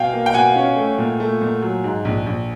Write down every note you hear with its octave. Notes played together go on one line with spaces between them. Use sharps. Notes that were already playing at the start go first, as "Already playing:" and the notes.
Already playing: B2 F5 G5 G#5
A#3
G5
B2 F#5 G#5
C#4
A3
A#2
A3
A#2
F#3
G#2
A#1
A#1